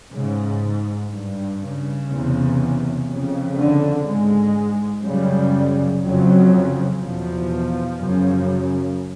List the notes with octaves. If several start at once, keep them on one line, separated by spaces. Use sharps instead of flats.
G#2 C#3
G2
C#3
E2 C3
F2 C#3
D3
G#2 G#3
F#2 C#3 G3
F2 C#3 F#3
E2 B2 F3
F#2 C#3